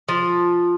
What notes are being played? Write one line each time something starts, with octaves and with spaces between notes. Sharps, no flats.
F3